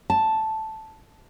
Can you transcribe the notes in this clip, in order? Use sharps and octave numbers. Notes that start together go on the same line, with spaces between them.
A5